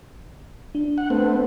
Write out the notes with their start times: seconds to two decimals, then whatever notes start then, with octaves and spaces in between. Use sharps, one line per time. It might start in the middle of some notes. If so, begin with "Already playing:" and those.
0.75 D4
0.98 F#5
1.10 A3 B3 C4